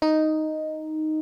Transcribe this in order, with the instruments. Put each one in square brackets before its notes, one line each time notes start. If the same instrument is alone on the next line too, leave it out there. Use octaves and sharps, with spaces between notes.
[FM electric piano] D#4